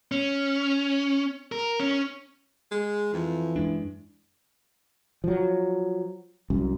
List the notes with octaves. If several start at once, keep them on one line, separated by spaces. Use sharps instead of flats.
C#4
A#4
C#4
G#3
F2 E3
F#2 G#3 D4
F3 F#3
C2 F#2